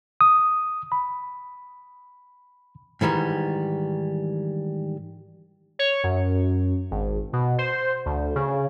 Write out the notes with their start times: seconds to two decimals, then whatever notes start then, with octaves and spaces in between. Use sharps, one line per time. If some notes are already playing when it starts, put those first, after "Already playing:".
0.21 D#6
0.92 B5
3.01 G#2 D#3 E3 G3
5.79 C#5
6.04 F#2
6.91 G#1
7.33 B2
7.58 C5
8.06 D2
8.36 C#3